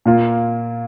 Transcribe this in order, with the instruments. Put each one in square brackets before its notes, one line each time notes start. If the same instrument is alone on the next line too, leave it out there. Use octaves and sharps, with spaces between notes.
[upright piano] A#2 A#3 F4